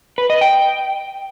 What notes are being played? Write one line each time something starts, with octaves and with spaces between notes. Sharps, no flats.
B4
D#5
G5